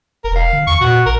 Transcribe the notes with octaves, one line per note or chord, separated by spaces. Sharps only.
E1 A#4
F5
D3
E2 C#6
A#2 F#4
A1 A#4